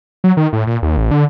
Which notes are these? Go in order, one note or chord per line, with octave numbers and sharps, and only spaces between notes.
F#3
D#3
A2
A#2
D#2
A1
D3